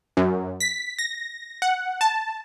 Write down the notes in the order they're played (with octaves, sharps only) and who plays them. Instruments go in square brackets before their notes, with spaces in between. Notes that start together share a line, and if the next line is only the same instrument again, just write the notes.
[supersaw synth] F#2
B6
A#6
F#5
A5